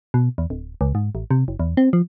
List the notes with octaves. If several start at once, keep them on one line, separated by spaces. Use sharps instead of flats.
B2
E2
D1
C#2
G#2
A1
C3
F#1
E2
C4
F3